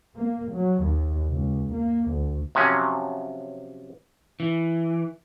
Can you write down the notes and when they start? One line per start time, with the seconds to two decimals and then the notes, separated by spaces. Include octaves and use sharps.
0.17 A#3
0.55 F#3
0.84 D#2
1.29 C#2
1.75 A#3
2.09 D2
2.55 C3 F3 F#3 C#4
4.40 E3